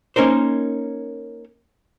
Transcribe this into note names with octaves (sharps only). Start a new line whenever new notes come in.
A#3 C#4 D#4 A#4 C5